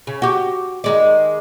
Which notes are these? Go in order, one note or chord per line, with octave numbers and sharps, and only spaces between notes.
C#3
F#4 G4
D#3 G#3 D5